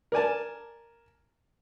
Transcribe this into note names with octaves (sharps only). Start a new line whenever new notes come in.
A#4 D5 G#5 A5